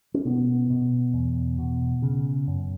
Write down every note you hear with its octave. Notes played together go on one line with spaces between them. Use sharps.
C#4
B2 B3
B2
E2
B2
C#3
F#2